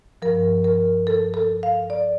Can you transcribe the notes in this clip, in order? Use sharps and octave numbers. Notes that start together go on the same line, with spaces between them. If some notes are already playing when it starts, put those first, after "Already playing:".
G2 F3 A#4
A#4
A4
A4
F5
D5